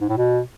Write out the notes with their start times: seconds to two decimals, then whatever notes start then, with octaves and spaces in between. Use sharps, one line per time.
0.01 G#2
0.09 A2
0.17 B2